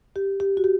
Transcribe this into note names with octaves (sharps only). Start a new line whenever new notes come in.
G4
G4
F#4
G4